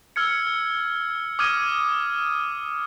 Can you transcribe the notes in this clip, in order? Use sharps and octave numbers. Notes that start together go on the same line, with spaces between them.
E6 F6 G#6 C#7
D6 D#6 F6 G#6 D#7